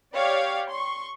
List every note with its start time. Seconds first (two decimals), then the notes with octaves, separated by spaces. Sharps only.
0.14 G4 C#5 D5 F5
0.69 C6 C#6